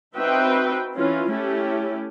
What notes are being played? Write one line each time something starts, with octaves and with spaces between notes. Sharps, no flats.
C4 D#4 F#4 B4 E5 G5
E3 C#4 F4
A3 C#4 E4 G4